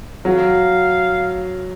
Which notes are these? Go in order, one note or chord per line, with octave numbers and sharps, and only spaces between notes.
F#3 F5